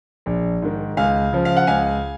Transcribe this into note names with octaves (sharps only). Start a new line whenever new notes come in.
A#1
G#2 D#3
C#2 F5 G#5
C#3 F3
F5
F#5
C#2 F5 G#5